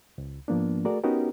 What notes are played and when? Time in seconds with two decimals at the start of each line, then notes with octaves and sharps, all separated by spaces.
0.18 C#2
0.48 G#2 F3 A#3 B3 D4
0.85 A3 F#4 G#4 A#4 D5
1.04 B3 C#4 D#4 F#4 G4 A#4